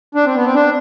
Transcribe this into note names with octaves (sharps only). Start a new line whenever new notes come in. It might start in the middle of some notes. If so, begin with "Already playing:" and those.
D4
C4
B3
C4
D4